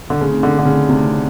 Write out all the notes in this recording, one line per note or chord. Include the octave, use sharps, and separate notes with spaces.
D3
C#3 A3 C4 D#4
D3
D3
C#3
C3 A3 C4 D#4